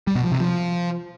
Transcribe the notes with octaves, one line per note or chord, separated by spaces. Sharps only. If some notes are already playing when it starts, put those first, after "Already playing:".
G3
B2
F3
C3
F3